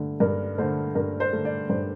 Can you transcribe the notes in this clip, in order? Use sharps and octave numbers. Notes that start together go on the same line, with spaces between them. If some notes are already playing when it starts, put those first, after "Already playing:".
Already playing: G2 D3 A3
G2 A#4
D3 A3 C5
G2 A#4
C5
D3 A3
D5
G2 C5